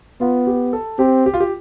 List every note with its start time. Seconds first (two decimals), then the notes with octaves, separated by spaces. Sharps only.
0.21 B3 F4
0.47 G4
0.73 A4
0.99 C4 G4
1.26 G4
1.34 F4
1.40 G4